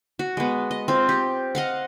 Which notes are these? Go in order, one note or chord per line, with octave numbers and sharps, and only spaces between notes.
F#4
G#3 B3
D#5
C4 F4
G4
D#5 F5 F#5